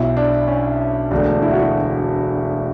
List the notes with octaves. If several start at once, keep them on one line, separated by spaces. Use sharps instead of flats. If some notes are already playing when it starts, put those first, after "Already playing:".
Already playing: B1 B2 E4
D4
C#4
E1 D2 D3 D4
E4
F#4
E4